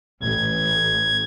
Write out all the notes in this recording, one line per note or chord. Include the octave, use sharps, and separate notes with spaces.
A1 G#6